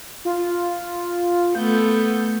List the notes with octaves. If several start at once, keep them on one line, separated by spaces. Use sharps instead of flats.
F4
A3 B3 A4 G6